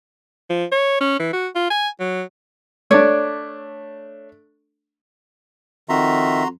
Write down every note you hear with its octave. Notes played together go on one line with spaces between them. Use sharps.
F3
C#5
C#4
E3
F#4
F4
G#5
F#3
A3 D4 C#5 D5
F2 D#3 F#4 E5 A#5 C6